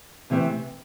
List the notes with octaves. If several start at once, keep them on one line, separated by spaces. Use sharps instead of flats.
C3 E3 A3 C4